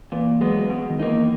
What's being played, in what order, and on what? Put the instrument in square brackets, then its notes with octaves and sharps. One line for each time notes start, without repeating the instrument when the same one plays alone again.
[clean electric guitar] A#2 [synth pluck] E3
[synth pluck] F#3 [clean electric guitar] G#3 B3
[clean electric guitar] B2
[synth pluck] D#3
[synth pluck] E3 [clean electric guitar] A#3 D#4